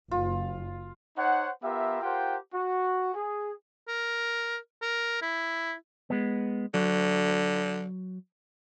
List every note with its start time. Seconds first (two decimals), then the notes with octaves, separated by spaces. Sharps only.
0.11 F#1 F4
1.16 D#4 C5 C#5 F#5
1.62 B3 F4 G4 A#4 E5
2.02 F4 G4 A#4 C5 F#5 G5
2.52 F#4
3.14 G#4
3.88 A#4
4.82 A#4
5.22 E4
6.10 G#3 B3
6.74 D3 F#3